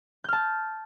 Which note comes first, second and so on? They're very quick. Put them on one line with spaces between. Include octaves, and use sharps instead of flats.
G6 F6 A5